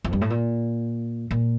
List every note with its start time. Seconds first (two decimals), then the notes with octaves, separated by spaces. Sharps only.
0.04 F2
0.13 G2
0.21 A2
0.30 A#2
1.31 A#2